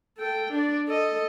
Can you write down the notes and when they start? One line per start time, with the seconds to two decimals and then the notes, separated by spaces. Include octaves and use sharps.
0.18 A4 G5
0.52 D4 D5
0.87 A4 D#5